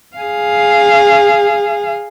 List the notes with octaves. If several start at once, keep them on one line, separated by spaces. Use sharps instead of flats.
G#4 F5